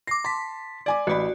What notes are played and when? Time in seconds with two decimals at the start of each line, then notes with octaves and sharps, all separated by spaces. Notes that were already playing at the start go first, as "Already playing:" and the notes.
0.07 D6 A#6 C7
0.25 A5 C6 B6
0.86 D5 G#5 D6
1.07 A1 F#4 D5 B5